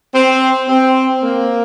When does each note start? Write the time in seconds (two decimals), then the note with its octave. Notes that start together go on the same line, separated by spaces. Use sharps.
0.13 C4
0.67 C4
1.22 A#3